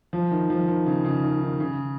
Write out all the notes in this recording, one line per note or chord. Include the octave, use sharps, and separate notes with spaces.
F3
D#3
F3
D#3
C#3
C#3
D#3
D#3
C#3